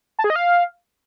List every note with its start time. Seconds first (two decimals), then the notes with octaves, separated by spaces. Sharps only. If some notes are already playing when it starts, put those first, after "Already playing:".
0.19 A5
0.24 G#4
0.30 D#5
0.36 F5